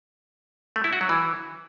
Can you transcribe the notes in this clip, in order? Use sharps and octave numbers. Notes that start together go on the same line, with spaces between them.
A3
E4
F#4
F#3
E3